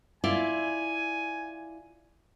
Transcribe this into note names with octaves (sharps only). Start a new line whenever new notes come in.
E4 F4 D5 G#5